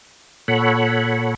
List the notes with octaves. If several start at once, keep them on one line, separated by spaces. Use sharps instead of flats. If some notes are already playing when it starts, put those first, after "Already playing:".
A#2 A4 C#5 F#5 B5